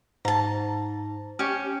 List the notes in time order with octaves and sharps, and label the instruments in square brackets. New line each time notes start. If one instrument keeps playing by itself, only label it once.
[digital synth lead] G#2 [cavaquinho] A5 A#5
[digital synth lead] C#4 [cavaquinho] G4 C#5